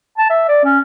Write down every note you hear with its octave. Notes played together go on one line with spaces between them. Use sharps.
A5
E5
D5
C#4